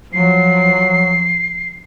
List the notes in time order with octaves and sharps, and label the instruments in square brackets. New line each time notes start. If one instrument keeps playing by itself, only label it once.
[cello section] F3 [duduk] F#3 [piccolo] C7